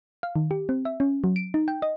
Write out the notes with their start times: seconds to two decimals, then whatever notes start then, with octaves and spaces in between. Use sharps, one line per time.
0.23 F5
0.36 D#3
0.51 G4
0.69 C4
0.85 E5
1.00 C#4
1.24 F#3
1.36 D7
1.54 D#4
1.68 G5
1.82 D#5